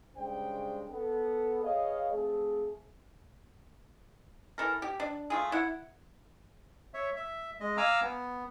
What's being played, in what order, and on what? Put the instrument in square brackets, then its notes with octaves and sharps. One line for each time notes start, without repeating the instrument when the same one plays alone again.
[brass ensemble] C#3 G3 G#3 D4 C5 G5
B3 A4
G#4 B4 C#5 D#5 F5
F3 A3 C4 G#4
[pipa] E3 A4 A#4
G4
D4
A3 F4 G#4
E4 F#5
[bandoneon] C#5 E5
E5
G#3 D#5
F5 G#5 A#5 D6 E6 F6
B3